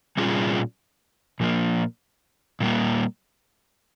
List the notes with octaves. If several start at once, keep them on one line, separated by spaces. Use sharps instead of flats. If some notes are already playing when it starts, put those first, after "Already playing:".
A#2 G3 C#4 F4 G#4
A#2 F3 A#3
A#2 G3 A#3